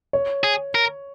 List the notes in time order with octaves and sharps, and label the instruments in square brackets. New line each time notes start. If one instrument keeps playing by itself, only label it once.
[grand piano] C#5
[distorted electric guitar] G#4
A#4